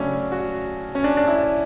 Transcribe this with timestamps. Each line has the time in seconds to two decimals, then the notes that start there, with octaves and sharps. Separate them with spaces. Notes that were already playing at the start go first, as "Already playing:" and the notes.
Already playing: C#3 F#3 A3 C#4 D4
0.32 F#4
0.95 C#4
1.04 D4
1.17 D4
1.27 E4